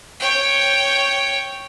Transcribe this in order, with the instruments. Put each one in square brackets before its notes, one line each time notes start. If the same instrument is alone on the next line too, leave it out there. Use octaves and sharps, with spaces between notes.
[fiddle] C#5 G5